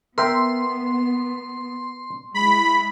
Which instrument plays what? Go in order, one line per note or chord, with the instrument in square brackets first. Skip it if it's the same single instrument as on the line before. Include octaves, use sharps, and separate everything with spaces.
[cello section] B3 [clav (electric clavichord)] A#4 E5 G5 [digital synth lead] C6
[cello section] G#3 E4 [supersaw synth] B5